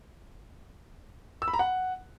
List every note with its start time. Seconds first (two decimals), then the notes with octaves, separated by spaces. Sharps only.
1.42 E6
1.48 B5
1.53 A#5
1.59 F#5